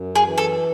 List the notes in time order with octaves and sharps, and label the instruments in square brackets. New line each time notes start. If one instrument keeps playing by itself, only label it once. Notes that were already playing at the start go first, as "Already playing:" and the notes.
Already playing: [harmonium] F#2
[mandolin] G#4
[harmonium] E3
[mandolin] A4